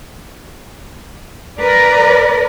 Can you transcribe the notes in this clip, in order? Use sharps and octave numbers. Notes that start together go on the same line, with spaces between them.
A#4 B4 D5